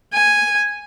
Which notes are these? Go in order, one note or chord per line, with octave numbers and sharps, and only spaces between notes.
G#5